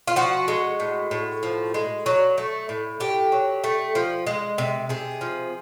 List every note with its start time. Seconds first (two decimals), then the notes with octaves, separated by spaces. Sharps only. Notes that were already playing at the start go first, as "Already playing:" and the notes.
0.07 F4
0.16 F3 F#4
0.48 G#3
0.80 A2
1.11 A2
1.43 F3
1.74 G#3
2.06 F#3
2.38 A3
2.69 A2
3.00 A2 G4
3.32 F#3
3.64 A3
3.95 F3
4.27 G#3
4.58 C3
4.89 C3 G#4
5.21 F3